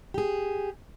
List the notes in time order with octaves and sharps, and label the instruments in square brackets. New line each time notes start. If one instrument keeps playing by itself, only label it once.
[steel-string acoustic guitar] G4 G#4